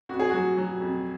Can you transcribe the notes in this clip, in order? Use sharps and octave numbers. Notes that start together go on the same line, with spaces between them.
F2 F#4
G#4
F#3 F#4
F#3
F2